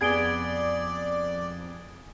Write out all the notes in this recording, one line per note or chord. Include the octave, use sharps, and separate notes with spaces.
F2 B3 G#4 D5 G#6 D7 G7